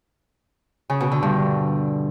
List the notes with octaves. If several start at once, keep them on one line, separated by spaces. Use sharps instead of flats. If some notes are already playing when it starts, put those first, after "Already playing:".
C#3
B2
D3
G2